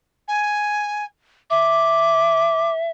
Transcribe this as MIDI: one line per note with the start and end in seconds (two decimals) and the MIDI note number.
0.28 1.04 80
1.50 2.90 76
1.50 2.71 86